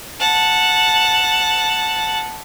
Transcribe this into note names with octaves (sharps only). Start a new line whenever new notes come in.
F#5 A5